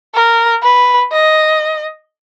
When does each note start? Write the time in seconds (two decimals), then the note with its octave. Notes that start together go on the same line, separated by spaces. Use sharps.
0.14 A#4
0.63 B4
1.12 D#5